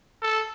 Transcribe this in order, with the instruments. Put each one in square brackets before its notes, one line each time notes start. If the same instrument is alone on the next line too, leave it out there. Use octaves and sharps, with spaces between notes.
[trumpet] A4